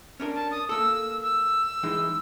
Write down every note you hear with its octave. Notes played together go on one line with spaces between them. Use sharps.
C#4 D4 A#4
A5
D#6
A#3 A4 E6
E6
E3 G#3 D#4